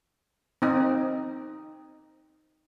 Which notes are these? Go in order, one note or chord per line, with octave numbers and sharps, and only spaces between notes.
C4 D#4